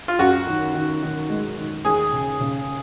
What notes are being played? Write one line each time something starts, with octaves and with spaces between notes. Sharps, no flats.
F4
F#2 F#4
D#3
D#3
D#3
G#3
D#3
D#2 G#4
C#3
C#3